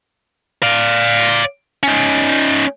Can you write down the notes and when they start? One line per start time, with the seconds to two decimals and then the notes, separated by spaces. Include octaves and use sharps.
0.63 D5 F5
1.83 C#4 D#4